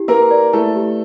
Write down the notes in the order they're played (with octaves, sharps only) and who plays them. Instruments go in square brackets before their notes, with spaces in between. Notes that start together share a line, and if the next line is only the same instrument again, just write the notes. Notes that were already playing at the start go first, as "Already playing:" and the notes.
Already playing: [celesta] E4 G4
[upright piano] A#3 A#4 [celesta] B4
[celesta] D5
[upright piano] A3 A4 [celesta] E4
[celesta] G4